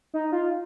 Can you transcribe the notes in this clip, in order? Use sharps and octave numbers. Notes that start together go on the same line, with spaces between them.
D#4
F4